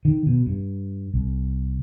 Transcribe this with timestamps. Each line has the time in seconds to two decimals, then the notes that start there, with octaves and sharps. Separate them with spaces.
0.05 D#3
0.26 B2
0.47 G2
1.14 C2